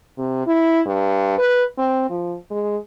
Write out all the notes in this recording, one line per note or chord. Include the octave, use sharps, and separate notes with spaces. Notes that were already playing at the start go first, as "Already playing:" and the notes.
C3
E4
G2
B4
C4
F3
G#3